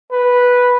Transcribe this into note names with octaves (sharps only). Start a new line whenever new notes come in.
B4